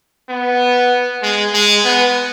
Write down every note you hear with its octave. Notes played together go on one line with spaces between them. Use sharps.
B3
G#3
G#3
B3